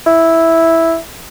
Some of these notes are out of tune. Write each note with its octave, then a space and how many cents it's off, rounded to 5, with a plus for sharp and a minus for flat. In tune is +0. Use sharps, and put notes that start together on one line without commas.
E4 -5